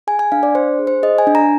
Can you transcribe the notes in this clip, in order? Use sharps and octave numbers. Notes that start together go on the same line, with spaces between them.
G#4 G#5
G#5
D4 F5
D5
D4 C5
G#4
C5
G#4 D#5
G#5
D4
A#5